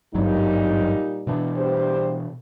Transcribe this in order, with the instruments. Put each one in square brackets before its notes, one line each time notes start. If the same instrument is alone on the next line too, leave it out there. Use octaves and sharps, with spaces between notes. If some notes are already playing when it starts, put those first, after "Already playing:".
[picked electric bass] G#1 G2 F#3 [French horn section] A#2 G3 D#4
[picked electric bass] B2 E3 D4
[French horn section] G3 G4 C5